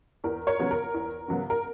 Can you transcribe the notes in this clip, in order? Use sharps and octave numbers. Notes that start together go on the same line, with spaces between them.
E2 A#4
A#4 C#5
C#3 F#3 B3
A#4
E2
C#3 F#3 B3
A#4